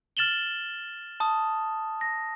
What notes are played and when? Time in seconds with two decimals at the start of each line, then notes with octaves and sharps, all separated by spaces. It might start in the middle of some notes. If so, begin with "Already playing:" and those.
0.17 F6 A6 E7 F#7 G7
1.20 A5 D#6
2.01 A#6